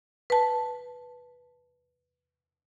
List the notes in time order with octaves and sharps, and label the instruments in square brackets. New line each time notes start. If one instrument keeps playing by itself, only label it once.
[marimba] B4 A5